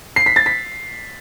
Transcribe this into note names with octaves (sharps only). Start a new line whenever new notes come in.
C7
B6
A6
B6